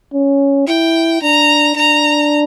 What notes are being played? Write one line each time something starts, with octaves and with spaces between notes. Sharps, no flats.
C#4
E4 G5
D4 A#5
D4 A#5